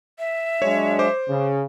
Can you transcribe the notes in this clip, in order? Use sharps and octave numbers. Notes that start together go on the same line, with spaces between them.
E5
F#3 G#3 D4 C#5
C5 D6
C#3